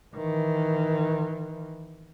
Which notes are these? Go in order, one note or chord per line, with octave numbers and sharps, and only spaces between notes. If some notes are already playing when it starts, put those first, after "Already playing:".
D#3 E3